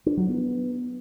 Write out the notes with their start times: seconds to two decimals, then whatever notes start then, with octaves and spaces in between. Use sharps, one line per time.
0.06 D4
0.17 F#3
0.28 B3